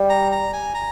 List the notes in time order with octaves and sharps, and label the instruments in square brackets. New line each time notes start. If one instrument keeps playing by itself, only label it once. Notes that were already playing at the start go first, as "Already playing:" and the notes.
Already playing: [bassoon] G3
[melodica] A#5
A#5
G#5
A#5